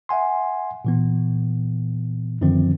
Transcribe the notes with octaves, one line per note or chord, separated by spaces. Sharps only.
E5 F#5 G#5 C6
A#2 E3 B3
F#2 D3 D#3 F3 C4